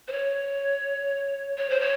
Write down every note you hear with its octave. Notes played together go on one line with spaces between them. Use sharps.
C5
C#5
C#5
C5
C#5